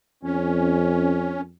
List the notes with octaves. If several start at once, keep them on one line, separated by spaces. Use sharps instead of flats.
F2 C#4